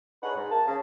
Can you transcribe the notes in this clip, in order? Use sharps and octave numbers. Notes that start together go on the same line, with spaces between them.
D4 D#4 G#4 B4 C#5 F#5
G#2
A#3 A5
C#3